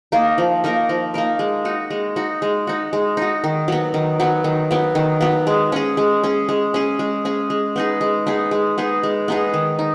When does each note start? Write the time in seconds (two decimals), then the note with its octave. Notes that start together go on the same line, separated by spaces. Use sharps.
0.12 A#3 D#4 A#4
0.38 F3
0.64 A#3 D#4 A#4
0.89 F3
1.14 A#3 D#4 A#4
1.39 G#3
1.65 D#4 F#4
1.90 G#3
2.16 D#4 F#4
2.42 G#3
2.67 D#4 F#4
2.93 G#3
3.17 D#4 F#4
3.44 D#3
3.68 F#3 B3
3.94 D#3
4.20 F#3 B3
4.44 D#3
4.71 F#3 B3
4.95 D#3
5.21 F#3 B3
5.47 G#3
5.72 C#4 G#4
5.97 G#3
6.24 C#4 G#4
6.49 G#3
6.74 C#4 G#4
6.99 G#3
7.25 C#4 G#4
7.50 G#3
7.76 B3 D#4 G#4
8.01 G#3
8.27 B3 D#4 G#4
8.51 G#3
8.78 B3 D#4 G#4
9.03 G#3
9.28 B3 D#4 G#4
9.54 D#3
9.79 D#4